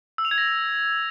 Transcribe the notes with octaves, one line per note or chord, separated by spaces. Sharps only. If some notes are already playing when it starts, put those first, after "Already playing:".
E6
F7
G#6
A#6